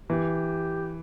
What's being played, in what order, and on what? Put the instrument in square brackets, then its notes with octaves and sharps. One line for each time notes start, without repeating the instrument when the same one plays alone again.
[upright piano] E3 [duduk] G4